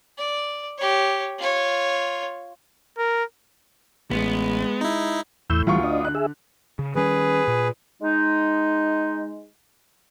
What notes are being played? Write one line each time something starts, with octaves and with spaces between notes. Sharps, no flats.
D5
G4 C#5
F4 C#5
A#4
A1 G#3 B3
D#4 E4
E2 A2 E6 G6
D2 E3 G3 F4 C#6
D4 D#5
D3 F#6
G#4 E5
C#3
D#3 G3 C#4 G#4 B4
A#2
G#3 D#4